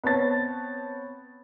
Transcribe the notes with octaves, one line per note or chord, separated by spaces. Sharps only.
B3 C4 C#5 A5 A6